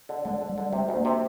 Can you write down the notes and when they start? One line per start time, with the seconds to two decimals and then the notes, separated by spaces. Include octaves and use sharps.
0.09 D3
0.25 D3 G#3
0.41 D3
0.49 G3
0.58 D3
0.73 C3 G#3
0.89 D2
0.96 A#3
1.05 C3